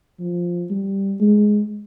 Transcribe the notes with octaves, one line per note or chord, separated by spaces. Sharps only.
F3
G3
G#3